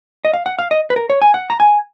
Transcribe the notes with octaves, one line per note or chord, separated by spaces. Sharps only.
D#5
F5
F#5
F5
D#5
B4
A#4
C#5
G#5
F#5
A#5
G#5